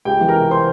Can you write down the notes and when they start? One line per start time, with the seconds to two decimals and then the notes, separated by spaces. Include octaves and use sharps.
0.05 C#2 G4 G5
0.21 E3
0.28 A#4 A#5
0.36 C3
0.51 C5 C6